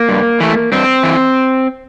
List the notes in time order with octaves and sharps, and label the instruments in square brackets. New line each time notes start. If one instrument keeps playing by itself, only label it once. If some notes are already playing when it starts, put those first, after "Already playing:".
Already playing: [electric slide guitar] A#3
G2
E3 A3
G2 C4
E3